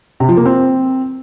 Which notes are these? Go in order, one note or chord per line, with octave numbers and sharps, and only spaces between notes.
C3
F3
A#3
C4